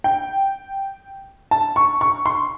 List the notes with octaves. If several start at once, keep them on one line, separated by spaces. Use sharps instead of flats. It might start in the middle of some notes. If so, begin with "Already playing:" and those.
G5
A5
C#6
C#6
C6